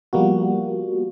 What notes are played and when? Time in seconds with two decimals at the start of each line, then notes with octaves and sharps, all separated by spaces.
0.13 F3 G3 A#3 B3 F#4